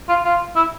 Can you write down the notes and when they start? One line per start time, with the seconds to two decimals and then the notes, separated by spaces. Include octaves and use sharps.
0.09 F4
0.24 F4
0.56 E4